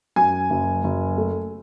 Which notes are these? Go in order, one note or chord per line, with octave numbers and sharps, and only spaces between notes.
F#2 G#5
F#1
F#1
A3